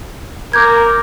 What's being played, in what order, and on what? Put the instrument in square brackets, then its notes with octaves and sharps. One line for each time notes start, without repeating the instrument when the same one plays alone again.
[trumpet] A#4 [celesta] D6 G6 G#6